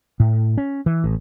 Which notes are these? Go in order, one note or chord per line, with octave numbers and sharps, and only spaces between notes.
A2
C#4
E3
A1